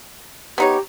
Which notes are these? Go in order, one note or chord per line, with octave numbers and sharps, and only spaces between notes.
B3 D#4 G4 C#5